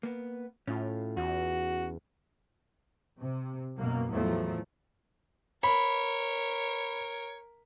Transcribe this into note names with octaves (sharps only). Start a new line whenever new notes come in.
A#3 B3
A2 C#4 F4
E2 F#4
C3
F#2 B2 A#3
E2 A2 F3 F#3 A3
A#4 C#5 B5